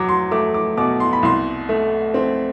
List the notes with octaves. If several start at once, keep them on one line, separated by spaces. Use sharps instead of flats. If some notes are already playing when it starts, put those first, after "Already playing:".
Already playing: E2 F#3 D6
C6
A3 D6
D6
B2 D6
C6
B5
C2 C6
A3
C4